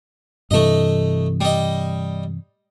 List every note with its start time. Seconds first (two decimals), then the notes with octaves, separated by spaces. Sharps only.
0.51 G2 C3 E3 A3 D#5
1.41 G3 D#5